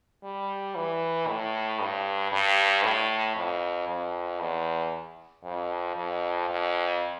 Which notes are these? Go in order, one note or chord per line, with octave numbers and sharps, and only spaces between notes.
G3
E3
A2
G2
G2
A2
F2
F2
E2
F2
F2
F2